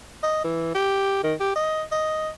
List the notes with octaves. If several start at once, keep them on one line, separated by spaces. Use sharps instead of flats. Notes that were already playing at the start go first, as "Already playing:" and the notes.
D#5
E3
G4
D#3
G4
D#5
D#5